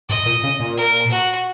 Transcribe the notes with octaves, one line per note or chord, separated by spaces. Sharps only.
G#2 D#5
A#2
C#3
A#2
A#4
F#4